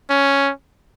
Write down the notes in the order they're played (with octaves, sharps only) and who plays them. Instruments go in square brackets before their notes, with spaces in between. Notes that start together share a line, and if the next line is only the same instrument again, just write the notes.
[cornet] C#4